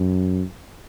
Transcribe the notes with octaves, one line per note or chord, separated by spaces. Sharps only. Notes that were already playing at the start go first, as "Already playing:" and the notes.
Already playing: F#2